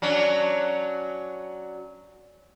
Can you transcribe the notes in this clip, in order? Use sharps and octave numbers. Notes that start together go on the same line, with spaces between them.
F#3 C#4 D4